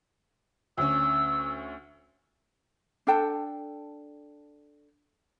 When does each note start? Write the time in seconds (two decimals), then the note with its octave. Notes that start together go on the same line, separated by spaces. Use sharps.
0.78 D2 C#4 E6
3.07 D4 A4 G5 A5